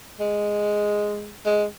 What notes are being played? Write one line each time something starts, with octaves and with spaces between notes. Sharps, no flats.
G#3
G#3